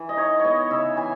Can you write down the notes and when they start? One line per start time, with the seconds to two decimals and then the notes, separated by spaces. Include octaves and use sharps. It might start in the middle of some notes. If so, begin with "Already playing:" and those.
Already playing: E3
0.09 D#5
0.17 D#4 C#5
0.40 B3 C#5 D#5
0.71 C#3 E5
0.97 E3 G#5